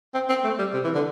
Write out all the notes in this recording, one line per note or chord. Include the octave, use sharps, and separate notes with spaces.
C4
C4
A3
G3
C3
E3
D3